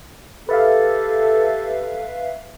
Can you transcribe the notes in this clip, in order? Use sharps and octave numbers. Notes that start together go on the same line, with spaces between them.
G4 A4 B4 E5 F5